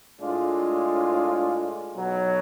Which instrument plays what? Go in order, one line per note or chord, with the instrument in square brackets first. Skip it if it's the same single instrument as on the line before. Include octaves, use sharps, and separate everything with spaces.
[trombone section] A2 G#3 D4 F4
B1 B2 F#3